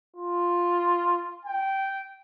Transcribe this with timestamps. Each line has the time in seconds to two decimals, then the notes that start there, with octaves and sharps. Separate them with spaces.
0.16 F4
1.45 G5